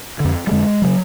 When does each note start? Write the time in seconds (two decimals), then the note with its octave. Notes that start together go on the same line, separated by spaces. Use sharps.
0.20 F2 D3
0.47 G3
0.51 F2 D3 G#3
0.82 C#3 F#3